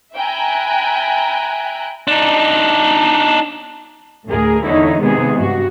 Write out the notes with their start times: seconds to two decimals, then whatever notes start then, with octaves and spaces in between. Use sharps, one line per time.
0.15 E5 G5 G#5 A#5 B5 F#6
2.08 D4 D#4
4.27 D2 A2 G#4 A#4
4.64 E2 D3 D#4 E4 C#5
5.01 C3 D#3 G#3 B3 G#4
5.37 G2 F#4